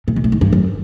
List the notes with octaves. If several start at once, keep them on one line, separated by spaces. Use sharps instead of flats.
A#2
B2
A2
G#2
G2
F#2